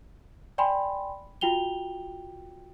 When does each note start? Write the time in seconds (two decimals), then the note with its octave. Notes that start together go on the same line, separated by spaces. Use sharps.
0.58 D5 G5 G#5 B5 C6
1.41 F4 F#4 G5 F7 G7